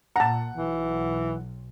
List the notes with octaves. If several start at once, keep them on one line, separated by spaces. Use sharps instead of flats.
A#2 F#5 A5 A#5
B1 E3